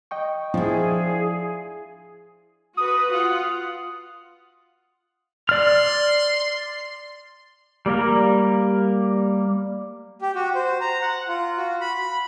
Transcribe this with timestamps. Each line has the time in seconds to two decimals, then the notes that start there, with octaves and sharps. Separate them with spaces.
0.11 D#5 G5 C#6
0.54 F3 D4 E4 G#4
2.77 F#4 B4 D#6
3.13 F4 F#5
5.49 D5 C6 F6
7.86 G3 A#3 A#4
10.22 G4
10.35 F#4
10.55 C5
10.81 A#5
11.02 F#5
11.28 F4
11.58 F#4
11.81 B5
11.98 B5